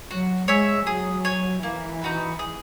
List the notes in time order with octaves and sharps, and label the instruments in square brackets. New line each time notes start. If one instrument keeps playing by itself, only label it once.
[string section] F#3 [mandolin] F#4
[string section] G#3 [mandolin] C#5 E5 G#5
[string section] F#3 [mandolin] G#4
[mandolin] C#5 G#5
[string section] E3 [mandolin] A#3
[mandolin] D#4 F#4 B4
G#4